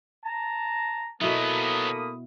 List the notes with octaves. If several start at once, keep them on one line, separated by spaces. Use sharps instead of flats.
A5 A#5
B2 F#3 A#3 B3 E4 A4 B5 D#6